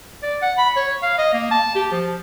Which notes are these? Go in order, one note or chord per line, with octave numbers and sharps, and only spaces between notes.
D5
F#5
B5
C#5
F5
D#5
A#3
A5
G4
F3